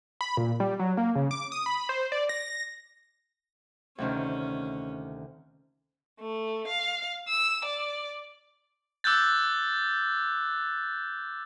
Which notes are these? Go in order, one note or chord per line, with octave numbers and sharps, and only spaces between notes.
B5
A#2
G3
F#3
A#3
C#3
D6
D#6
B5
C5
D5
A#6
D2 C3 D#3 C#4
A3
F5
E6
D5
D6 E6 F#6 G6 A6